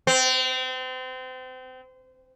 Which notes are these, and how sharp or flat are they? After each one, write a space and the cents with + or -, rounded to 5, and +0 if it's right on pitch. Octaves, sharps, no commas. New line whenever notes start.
C4 -30